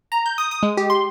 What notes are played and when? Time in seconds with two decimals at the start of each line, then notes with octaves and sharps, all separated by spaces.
0.12 A#5
0.26 G6
0.38 D#6
0.51 D#6
0.63 G#3
0.77 G4
0.90 C6